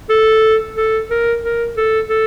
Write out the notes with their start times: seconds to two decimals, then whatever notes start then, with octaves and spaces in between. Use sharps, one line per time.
0.10 A4
0.76 A4
1.10 A#4
1.43 A#4
1.77 A4
2.09 A4